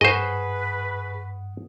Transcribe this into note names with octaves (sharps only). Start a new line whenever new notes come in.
G2 G#4 B4 C5 D#5 F#5 C#6